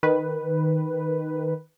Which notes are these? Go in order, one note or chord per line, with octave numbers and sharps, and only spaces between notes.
D#3 B4